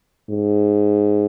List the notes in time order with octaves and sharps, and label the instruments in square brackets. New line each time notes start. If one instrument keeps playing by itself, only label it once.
[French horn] G#2